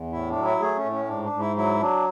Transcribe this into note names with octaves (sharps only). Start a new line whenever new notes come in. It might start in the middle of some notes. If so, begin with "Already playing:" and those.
Already playing: E2
A2 E4
D4
F#3
E4
A3 G#4
C#4
A2
C#4
G#2 D4
D4
G#2
E4
F#3 E4
F#3 D4